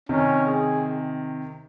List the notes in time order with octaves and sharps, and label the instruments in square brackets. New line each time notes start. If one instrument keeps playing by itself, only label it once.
[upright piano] C3 D#3 [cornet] C#4
[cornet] G#4